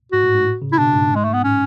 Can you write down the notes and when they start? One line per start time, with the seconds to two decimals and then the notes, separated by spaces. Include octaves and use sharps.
0.12 G#2 F#4
0.24 A2
0.34 G#2
0.45 A2
0.62 C#3
0.72 E4
0.78 B2 D4
0.94 G#2
1.11 G#2 G#3
1.24 A3
1.34 B3
1.44 A2 C#4